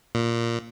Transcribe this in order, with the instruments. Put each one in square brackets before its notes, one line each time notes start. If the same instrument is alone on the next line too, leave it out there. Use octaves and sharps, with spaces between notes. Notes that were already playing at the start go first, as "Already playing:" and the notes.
[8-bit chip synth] A#2